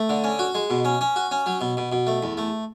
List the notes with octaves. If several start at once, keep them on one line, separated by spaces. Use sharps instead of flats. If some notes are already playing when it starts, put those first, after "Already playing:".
Already playing: A3
D3
C#4
F#4
G#3
B2
C#4
C#4
F#4
C#4
F#3
B2
B2
B2
A3
E2
A3